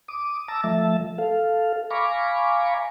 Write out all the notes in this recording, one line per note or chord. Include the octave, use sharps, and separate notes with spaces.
D6 D#6
A5 A#5 D6 E6
F3 A3 E5 A5
A4 F5
F5 G#5 A#5 B5 C#6 D6